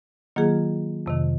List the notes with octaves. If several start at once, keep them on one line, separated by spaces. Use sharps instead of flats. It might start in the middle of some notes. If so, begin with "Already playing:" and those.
D#3 F#3 A#3 F4 G#4
F2 C3 D#3